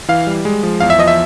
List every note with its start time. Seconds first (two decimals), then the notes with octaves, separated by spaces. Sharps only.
0.08 E3 F5
0.27 G3
0.45 G#3
0.63 F3
0.80 E2 F5
0.90 E5
0.98 F3 D#5
1.08 E5